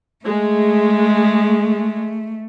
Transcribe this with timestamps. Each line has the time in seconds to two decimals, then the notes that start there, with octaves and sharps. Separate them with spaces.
0.25 G#3 A3